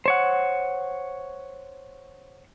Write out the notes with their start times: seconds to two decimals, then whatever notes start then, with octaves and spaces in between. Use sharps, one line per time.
0.06 C5 C#5 F#5